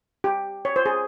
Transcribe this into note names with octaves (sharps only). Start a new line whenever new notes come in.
G4
C#5
C5
G#4